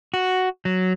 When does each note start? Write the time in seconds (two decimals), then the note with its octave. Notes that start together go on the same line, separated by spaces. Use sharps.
0.14 F#4
0.65 F#3